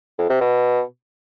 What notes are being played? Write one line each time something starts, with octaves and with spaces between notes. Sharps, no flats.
F2
C3
B2